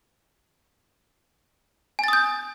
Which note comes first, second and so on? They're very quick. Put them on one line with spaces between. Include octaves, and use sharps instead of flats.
G#5 A6 D#6 G6